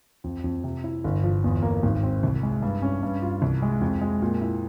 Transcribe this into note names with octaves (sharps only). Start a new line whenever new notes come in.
F2
F2
C3
E4
G1
F3
E2
A#3
G#1
C4
C2
G#3
G2
C#4
G2
F4
C2
G#3
F2
G#3
A#2
E4